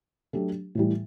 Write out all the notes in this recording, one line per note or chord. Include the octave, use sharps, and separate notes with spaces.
F#3 A3 D4 G4
A2 E3 G3